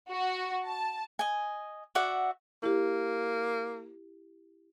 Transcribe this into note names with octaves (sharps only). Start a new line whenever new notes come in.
F#4
A5
D#5 G#5
F#4 D5 E5 F#5
A#3 E4 G4